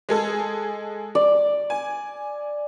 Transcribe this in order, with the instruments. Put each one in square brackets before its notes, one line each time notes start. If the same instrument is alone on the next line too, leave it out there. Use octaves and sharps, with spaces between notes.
[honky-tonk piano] G#3 G#4 A4
[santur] D5
[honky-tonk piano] G#5